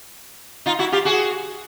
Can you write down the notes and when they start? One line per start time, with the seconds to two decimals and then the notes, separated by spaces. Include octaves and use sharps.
0.66 D#4 F4
0.79 E4 F#4
0.92 F4 G4
1.05 F#4 G#4